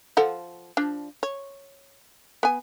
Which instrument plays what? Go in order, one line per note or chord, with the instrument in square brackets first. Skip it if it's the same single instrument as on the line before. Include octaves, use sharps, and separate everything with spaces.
[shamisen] F3 A4 F#5
F3 D4
C#5
B3 G#5